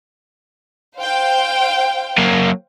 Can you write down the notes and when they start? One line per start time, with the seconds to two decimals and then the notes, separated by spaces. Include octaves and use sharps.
0.97 C5 F5 G5
2.18 F#3 A#3